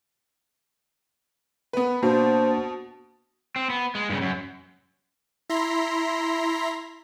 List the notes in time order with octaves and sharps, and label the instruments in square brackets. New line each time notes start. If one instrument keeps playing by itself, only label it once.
[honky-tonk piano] B3 B4
[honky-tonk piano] B2 [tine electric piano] A#3 D4 F#4 [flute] C5 [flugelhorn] A5
[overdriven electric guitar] C4
B3
G#3
G2 C#3
F#2
[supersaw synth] E4 A#5 C6 B6